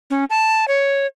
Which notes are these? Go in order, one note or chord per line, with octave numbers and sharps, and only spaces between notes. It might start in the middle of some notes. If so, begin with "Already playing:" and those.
C#4
A5
C#5